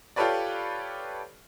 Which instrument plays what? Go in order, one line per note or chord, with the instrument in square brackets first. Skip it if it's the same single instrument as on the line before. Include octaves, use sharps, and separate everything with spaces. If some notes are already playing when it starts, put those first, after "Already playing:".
[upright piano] F4 G4 A4 B4 C#5 D5